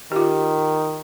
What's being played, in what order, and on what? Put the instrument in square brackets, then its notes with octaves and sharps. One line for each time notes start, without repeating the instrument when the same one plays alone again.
[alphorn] D#3 [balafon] F4 G4